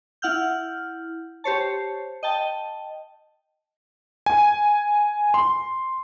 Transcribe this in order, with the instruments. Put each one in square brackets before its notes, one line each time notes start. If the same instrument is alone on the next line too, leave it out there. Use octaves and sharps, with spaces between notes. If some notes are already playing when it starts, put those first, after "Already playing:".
[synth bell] E4 F#5 F6 G6
G4 C5 C#5 A5
D#5 G5 A5
[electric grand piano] G#5
C6